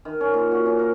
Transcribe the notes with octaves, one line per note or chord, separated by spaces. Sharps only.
D#3
C#4
A#2
F#4
C#4
A#4